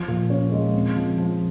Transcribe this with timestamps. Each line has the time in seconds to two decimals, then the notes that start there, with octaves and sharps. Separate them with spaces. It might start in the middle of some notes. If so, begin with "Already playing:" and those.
Already playing: F3
0.08 A#2
0.30 C#4
0.52 G#3
0.74 C4
0.96 F3
1.18 F3